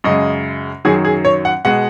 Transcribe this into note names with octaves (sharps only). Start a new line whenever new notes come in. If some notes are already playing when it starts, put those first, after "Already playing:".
F#2 C#3 G#3 D#5
F#2 D#3 F#3 G#4
G#4
C#5
F#5
B2 G#3 F#5